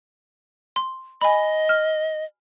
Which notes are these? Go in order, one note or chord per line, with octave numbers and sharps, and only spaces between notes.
C6
D#5 G#5 B5
F6